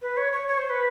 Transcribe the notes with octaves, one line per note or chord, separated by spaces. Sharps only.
B4
C#5
C#5
C#5
C5
B4